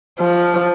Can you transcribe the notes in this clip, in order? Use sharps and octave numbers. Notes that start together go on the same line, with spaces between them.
F3